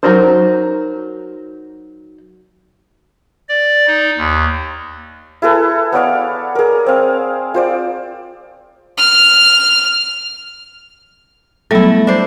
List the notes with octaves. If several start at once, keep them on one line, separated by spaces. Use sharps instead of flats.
F#3 D#4 F#4 A#4 C5
D5
D#4
D#2
E4 G#4 A4 B4
B3 C#5 D5 F5
G#4 A#4
C4 F5
F4 C5 D5
F6
F#3 G3 A3 B3 E4
D4 C5